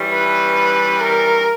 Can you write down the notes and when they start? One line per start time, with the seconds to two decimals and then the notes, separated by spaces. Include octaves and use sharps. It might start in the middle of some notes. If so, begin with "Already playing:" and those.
Already playing: E3 G3 C#4
0.13 B4
1.01 A#4